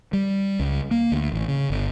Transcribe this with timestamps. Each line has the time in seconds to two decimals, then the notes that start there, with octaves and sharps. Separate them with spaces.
0.13 G3
0.59 C#2
0.91 A#3
1.12 D2
1.32 A1
1.48 C#3
1.70 G1